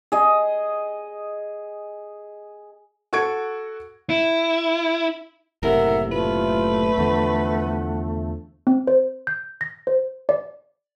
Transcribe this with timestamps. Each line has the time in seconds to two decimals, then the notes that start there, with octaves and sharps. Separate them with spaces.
0.12 G#4 D#5
3.13 F#4 A4 C#6 G#6 D7
4.10 E4
5.63 F#1 A2 C3 A#4 E5 F#5
6.12 A3 F4 B4
6.98 E2 D3 F3 F#5
8.67 C4
8.87 C5
9.27 G6
9.61 A#6
9.87 C5
10.29 D5